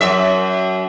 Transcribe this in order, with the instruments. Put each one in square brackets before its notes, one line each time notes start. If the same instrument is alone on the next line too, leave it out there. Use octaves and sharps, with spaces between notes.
[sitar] F#2 E5